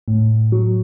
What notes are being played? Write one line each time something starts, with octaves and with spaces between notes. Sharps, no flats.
A2
F#3